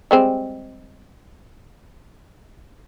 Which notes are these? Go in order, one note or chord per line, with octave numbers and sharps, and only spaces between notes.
G3 G#3 C4